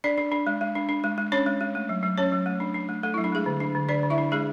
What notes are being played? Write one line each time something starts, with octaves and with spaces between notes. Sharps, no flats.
D4 D5
D4
D4
G#3
G#3
D4
D4
G#3
G#3
C#4 D4 C#5
G#3
G#3
A3
F#3
F#3
F#3 C#4 C#5
F#3
A3
D4
D4
A3
A3 A4
F#3 E4
D4
G#3 A3 G#4
D3
D4
D3
D3 D4 D5
D3
E4 E5
D4
G#3 D4 G#4